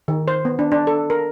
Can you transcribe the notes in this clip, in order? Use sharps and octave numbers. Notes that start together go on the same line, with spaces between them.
D#3
C5
B3
D4
D4
A4
A#4